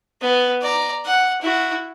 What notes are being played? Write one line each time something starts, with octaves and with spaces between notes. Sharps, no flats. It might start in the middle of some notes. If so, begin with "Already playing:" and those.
B3
D5 A#5
F#5
E4 F#4